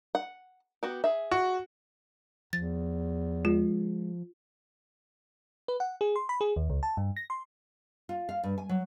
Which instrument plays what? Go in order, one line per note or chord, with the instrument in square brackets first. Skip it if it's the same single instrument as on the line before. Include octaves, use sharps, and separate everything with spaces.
[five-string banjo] F#5
B3 F#4 G4
G#4 E5
[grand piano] F#4
[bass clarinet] E2 [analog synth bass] F3 [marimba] A6
[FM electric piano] G#3 [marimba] F4
[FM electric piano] B4
F#5
G#4
C6
B5
G#4
D#2
C#2
A5
G2
A#6
C6
[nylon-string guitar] F4
F5
G2
G#5
F#3